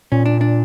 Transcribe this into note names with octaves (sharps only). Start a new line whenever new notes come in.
A#2 C#4
D4
D4